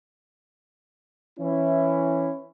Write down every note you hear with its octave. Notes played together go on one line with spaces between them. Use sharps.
E3 C#4 E4